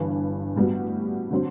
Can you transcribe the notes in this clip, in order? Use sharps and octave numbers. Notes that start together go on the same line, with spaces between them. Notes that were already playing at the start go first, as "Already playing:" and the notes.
Already playing: G1 G2 E3 D4
A2 G3 B3 F#4
D3 F#3 C4